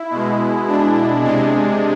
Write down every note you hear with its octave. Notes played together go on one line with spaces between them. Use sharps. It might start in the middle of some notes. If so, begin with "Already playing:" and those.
Already playing: E4
B2 G#3
D4
C3 G#3